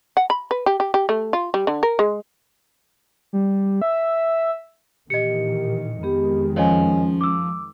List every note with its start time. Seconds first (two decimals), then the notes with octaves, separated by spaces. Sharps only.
0.17 F#5
0.30 B5
0.51 B4
0.66 G4
0.80 G4
0.94 G4
1.09 A3
1.33 F4
1.54 G3
1.67 D3
1.83 A#4
1.99 G#3
3.33 G3
3.82 E5
5.10 A#2 D#3 E3 G4 D#5 C#7
6.03 F2 D#3 G#3 B3 G4
6.56 F3 C#4 C#5 D#5 G#5
7.21 D6 E6